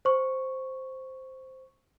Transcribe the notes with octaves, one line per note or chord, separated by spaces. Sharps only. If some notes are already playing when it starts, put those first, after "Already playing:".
C5 C#6